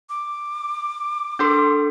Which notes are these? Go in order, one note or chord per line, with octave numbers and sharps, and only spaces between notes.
D6
D4 A4 A#4 C6 G6